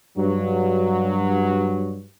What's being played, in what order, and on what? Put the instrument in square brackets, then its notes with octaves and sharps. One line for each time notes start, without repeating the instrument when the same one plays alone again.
[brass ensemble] G2 F#3